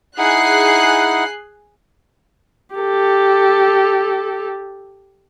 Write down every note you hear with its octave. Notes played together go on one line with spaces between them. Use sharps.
D#4 E4 G#4 F#5 F#6 C7
G4 A4